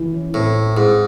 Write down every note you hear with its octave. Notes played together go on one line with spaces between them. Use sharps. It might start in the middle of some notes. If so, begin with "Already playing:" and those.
Already playing: E3
C#4
A2 C4
E4
G#2 E4